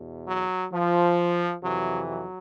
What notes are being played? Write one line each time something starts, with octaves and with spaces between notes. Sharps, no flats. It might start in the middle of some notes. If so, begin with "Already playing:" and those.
Already playing: E2 B2
F#3
F3
F2 C3 E3 F#3
F#3